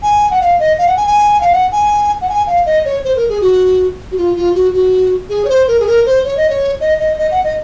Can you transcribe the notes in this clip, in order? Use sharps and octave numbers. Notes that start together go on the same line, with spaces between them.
G#5
F#5
F5
D#5
F5
F#5
G#5
G#5
F5
F#5
G#5
F#5
G#5
F5
D#5
C#5
C5
A#4
G#4
F#4
F#4
F4
F4
F#4
F#4
G#4
C#5
C5
A#4
G#4
A#4
C5
C#5
D#5
C#5
D#5
D#5
D#5
F#5
D#5